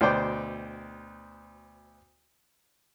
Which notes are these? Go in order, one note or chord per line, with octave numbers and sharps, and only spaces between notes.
D2 B2 C5 D5 G5 D6